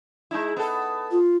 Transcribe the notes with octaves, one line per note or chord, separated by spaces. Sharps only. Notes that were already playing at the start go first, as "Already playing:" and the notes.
G#3 D#4 E4
B3 A4
F4